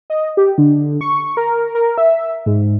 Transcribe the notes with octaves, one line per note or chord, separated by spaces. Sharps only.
D#5
G4
D3
C#6
A#4
A#4
E5
G#2